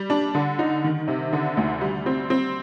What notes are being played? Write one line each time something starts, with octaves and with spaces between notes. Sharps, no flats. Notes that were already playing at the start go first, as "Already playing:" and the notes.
Already playing: G3
D4
D3
D#4
D#3
C3
D3
D2
G3
C4
C4